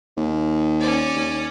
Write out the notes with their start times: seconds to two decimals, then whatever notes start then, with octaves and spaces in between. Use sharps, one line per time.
0.17 D#2
0.80 C#4 D5
1.16 D#2